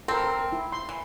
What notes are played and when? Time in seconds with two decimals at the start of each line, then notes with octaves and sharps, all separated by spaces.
0.08 C4 A4 A#4
0.24 A#4
0.52 E4
0.72 C6
0.89 E3